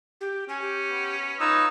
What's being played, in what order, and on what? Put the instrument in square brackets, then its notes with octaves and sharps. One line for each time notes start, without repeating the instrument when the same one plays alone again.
[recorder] G4
[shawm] C#4 [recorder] G#5
[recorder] G4
[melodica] B3
[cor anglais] D#4 [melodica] F4 B4 C#5 [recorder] E6